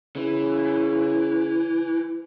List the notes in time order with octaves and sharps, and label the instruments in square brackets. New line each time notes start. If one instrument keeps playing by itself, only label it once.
[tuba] C#3 [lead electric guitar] E3